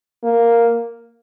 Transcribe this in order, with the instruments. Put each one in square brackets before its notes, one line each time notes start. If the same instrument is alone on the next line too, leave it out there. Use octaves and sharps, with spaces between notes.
[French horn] A#3